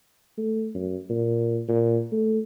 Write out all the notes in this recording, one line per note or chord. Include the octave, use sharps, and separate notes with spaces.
A3
F#2
A#2
A#2
A3